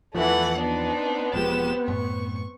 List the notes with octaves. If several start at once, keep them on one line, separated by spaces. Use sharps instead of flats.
E2 E3 F3 A3 F#5
B3 C4 D4 D#4
E1 F3 G#3 G4 E7
F#2 A2 C#6